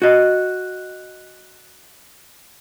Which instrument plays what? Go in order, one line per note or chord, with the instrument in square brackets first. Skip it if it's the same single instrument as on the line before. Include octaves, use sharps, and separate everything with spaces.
[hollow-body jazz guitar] F#4 D#5